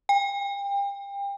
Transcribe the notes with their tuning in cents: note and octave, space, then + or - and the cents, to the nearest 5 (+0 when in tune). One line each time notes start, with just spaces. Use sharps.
G5 +35